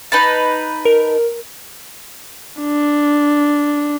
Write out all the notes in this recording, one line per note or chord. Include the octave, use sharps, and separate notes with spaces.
D#4 B4 A5
A#4
D4